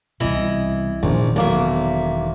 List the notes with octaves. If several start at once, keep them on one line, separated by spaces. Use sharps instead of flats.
C2 B2 E3 D#5 B5
E1 A#1 D#3 C#4
B1 F#2 A#3 E5